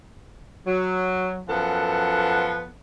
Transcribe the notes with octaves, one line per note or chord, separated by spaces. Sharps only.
F#3
F#2 F3 B3 A4 F#5